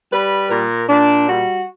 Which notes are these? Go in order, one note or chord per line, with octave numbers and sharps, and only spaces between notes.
G3 B4
A#2 A#4
A#2 D4
G3 F#4